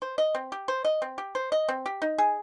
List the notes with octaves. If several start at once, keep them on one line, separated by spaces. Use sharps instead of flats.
C5
D#5
C4
G4
C5
D#5
C4
G4
C5
D#5
C4
G4
D#4
G#4